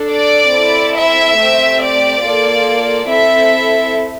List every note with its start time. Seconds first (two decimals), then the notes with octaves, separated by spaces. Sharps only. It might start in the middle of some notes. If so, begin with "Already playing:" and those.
Already playing: D4 A4
0.09 D5
0.53 C4 E4 A4
0.96 E5
1.38 A3 C4 G4
1.81 D5
2.24 A#3 F4 A4
3.09 C4 E4 A4 E5